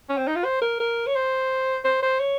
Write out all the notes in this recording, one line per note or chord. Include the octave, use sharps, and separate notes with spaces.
C#4
C4
D#4
F4
C5
A#4
A#4
C#5
C5
C5
C5
C#5